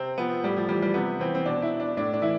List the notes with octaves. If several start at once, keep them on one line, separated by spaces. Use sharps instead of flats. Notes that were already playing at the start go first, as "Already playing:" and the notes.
Already playing: C3 C4
F3 B3
A2 G3
F3
E3 G3
G3
C3 B3
E3 C4
C4
B2 D4
E4
D4
A2 D4
D4
E3 E4